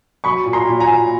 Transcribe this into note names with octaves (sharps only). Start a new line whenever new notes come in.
F#3 B5 C#6
A#2
A#5 C6
A#2
G#5 A#5
A#2